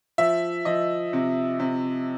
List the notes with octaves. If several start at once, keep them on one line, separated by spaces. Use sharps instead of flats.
F3 E5
F3 D#5
C3
C3